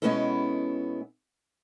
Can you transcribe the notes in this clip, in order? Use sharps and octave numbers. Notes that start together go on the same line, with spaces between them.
B2 G#3 B3 C#4 E4 A4